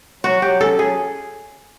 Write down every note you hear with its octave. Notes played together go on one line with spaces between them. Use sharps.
F#3 F#4
F#3 G4
C#4 A4
F#3 G#4